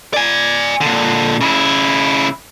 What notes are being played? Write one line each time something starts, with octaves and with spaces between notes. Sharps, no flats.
D5 G#5
A#2 D3
C#3 E4